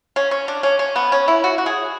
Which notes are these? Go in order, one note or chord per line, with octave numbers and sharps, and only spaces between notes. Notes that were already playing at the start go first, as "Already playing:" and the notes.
C#4
C#4
D4
C#4
C#4
B3
C#4
E4
F#4
F#4
G#4